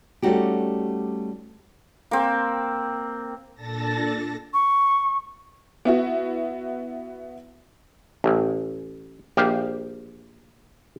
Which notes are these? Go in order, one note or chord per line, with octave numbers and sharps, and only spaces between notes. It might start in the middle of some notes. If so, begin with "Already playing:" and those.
G3 A3 C#4 D#4 F#4 G4
A#3 C4
A#2 D4 A4 A5 A6 A#6
C#6
B3 E4 F#4
A1
A#1 G4 F5